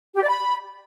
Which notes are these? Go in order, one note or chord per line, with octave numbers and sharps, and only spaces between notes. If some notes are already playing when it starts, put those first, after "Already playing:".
G4
D5
B5